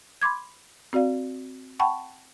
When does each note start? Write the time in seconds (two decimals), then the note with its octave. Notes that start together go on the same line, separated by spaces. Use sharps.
0.22 B5 C6 D6 G#6
0.93 C4 F#4 D5 F5
1.80 F#5 G5 A5 B5 C#6